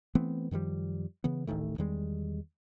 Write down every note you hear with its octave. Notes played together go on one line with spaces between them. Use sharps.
E3 A3 B3 C4
F#2 D#3 F3 G3
C#3 E3 B3
D1 A1 D#3 A3
E2 D#3 G3 G#3